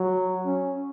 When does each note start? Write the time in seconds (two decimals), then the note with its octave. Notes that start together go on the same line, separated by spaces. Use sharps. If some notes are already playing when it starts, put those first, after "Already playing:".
Already playing: F#3
0.45 C#4